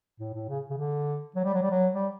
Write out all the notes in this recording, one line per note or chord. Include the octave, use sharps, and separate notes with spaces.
A2
A2
C#3
C#3
D3
F#3
G3
F#3
G3
F#3
G3